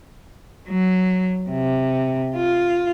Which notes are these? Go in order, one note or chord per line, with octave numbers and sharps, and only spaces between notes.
F#3
C3
F4